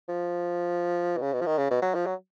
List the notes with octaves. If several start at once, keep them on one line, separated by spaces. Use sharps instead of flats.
F3
B2
C#3
B2
F3
D#3
C#3
B2
F#3
F3
F#3